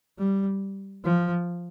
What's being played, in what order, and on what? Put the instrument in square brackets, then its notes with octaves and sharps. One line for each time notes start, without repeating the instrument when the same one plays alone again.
[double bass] G3
F3